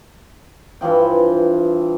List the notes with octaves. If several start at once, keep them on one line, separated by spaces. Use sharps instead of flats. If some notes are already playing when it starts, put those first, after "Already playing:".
G2 E3 F3 G5